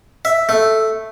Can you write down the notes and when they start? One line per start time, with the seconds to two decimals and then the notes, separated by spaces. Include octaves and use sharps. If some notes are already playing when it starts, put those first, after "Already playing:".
0.25 E5
0.49 A3